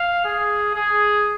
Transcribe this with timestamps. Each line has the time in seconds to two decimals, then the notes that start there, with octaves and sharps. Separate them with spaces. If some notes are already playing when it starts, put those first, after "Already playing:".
Already playing: F5
0.25 G#4
0.75 G#4